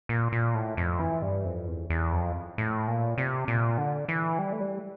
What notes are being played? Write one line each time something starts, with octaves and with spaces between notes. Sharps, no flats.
A#2
A#2
A2
F2
E3
G2
F2
E2
E2
F2
A2
A#2
C3
A#2
D3
E3
G3
A3
G3